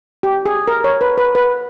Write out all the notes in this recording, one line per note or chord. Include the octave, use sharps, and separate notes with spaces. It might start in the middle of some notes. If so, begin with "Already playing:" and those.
G4
G#4
A#4
C#5
B4
B4
B4